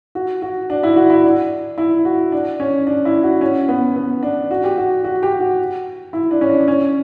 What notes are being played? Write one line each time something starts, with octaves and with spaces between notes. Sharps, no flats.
F#4
F#4
D4
E4
F#4
E4
D4
E4
F#4
D4
C#4
D4
E4
F#4
C#4
B3
B3
D4
F#4
G4
F#4
F#4
G4
F#4
E4
D4
C#4
D4
C#4